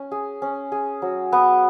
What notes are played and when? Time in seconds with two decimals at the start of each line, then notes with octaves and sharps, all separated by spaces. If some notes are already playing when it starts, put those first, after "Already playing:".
Already playing: C#4
0.11 G#4
0.42 C#4
0.72 G#4
1.02 F#3
1.32 B3